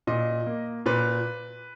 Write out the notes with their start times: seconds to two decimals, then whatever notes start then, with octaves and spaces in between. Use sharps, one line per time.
0.07 A#2 D#5
0.46 A#3
0.86 A#2 B4